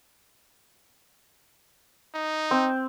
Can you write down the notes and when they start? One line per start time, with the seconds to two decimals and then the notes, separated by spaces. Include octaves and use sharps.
2.15 D#4
2.51 C4